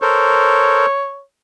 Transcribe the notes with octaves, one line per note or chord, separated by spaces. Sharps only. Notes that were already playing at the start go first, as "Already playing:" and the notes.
A4 A#4 C5 C#5